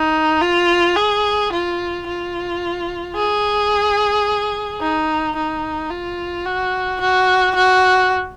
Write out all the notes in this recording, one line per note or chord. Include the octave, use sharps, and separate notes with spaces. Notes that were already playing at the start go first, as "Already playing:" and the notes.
Already playing: D#4
F4
G#4
F4
F4
G#4
D#4
D#4
F4
F#4
F#4
F#4